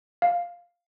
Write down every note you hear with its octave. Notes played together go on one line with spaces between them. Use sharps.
F5